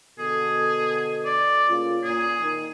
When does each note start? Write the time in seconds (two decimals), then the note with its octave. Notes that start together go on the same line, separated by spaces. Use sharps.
0.18 B2 D3 G#4 A4
1.25 D5
1.69 C#3 A#3 F4
2.03 A#2 G#4
2.40 D#3